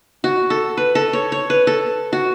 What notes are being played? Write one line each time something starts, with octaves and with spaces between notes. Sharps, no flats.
F#4
A4
B4
A4
C#5
C#5
B4
A4
F#4